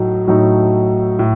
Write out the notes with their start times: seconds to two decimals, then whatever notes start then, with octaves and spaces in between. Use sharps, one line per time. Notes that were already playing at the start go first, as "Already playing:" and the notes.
Already playing: A2 F#3 A3 D#4
0.27 A2 F#3 A3 D#4
1.19 A2